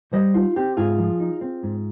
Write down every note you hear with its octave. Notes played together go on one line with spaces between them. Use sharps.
G3 C5 D#5
D#4 F4
C4 G4
G#2 F4 G#4
F3
D#4
C4
G#2